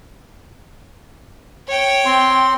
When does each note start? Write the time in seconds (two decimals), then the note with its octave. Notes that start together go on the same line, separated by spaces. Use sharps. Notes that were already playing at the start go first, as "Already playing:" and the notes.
1.67 C#5 G5
2.05 C4 C6